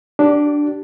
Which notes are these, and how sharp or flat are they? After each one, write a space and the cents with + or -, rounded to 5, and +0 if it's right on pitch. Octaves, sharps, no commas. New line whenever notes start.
D4 +0 G4 -30